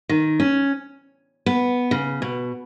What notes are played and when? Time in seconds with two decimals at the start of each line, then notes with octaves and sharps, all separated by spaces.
0.09 D#3
0.40 C#4
1.46 B3
1.91 C#3
2.22 B2